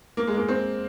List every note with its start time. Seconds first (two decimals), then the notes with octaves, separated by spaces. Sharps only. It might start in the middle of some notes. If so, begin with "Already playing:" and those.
0.17 A#3
0.27 G#3
0.37 A#3
0.48 C4